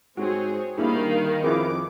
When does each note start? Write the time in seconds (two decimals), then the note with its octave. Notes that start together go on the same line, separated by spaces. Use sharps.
0.17 G#2 C4 F#4 G#4 C#5
0.78 G2 D#3 A#3 E4 G#4 F5 B5
1.43 F2 E4 G#4 B4 D6